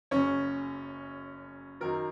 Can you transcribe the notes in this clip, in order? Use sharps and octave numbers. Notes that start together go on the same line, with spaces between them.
F#1 F#2 C#3 C#4 C#5
F#2 D#3 F#3 A#4